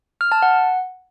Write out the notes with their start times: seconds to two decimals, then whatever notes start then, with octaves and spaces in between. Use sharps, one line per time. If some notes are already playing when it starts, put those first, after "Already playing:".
0.21 F6
0.32 A5
0.42 F#5